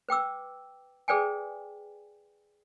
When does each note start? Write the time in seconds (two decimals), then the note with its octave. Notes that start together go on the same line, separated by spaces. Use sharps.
0.09 B4 G5 D6 E6
1.08 G#4 A4 B4 D5 G5 G#5